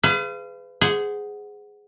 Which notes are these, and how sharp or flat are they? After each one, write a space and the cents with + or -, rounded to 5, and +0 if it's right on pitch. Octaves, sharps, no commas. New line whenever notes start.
G#4 +0 B4 +35 F5 -30
G#4 +0 C5 -20 F#5 +0